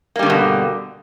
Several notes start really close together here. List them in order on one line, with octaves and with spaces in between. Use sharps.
A#3 G3 D3 G2 B2